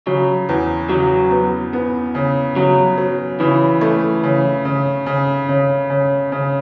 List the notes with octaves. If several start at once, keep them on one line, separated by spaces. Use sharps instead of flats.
C#3 F#3
E2
C#3 F#3
B3
B3
C#3
C#3 F#3
F#3
C#3 E3
A3
C#3
C#3
C#3
C#3
C#3
C#3